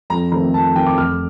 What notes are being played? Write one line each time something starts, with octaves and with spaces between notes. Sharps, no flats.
F2 A#5
D#3 A3 C4 A#5
F2 A5
D#3 A3 C4 G5
D6
F1 F6